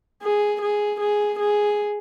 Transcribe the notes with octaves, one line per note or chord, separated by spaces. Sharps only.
G#4
G#4
G#4
G#4